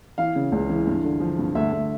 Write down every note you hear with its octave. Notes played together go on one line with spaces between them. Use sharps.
E3 F5
C#3
C#2
E3
G2
D3
F3
G2
D2 E5
D2